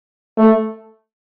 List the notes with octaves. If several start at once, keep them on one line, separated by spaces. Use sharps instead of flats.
A3